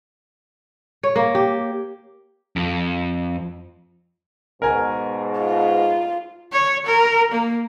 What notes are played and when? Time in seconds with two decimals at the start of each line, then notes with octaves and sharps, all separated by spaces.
1.03 C#5
1.16 A#3
1.35 G4
2.56 F2
4.62 G#2 B2 A#4 G#5
5.40 F4
6.52 C#5
6.86 A#4
7.32 A#3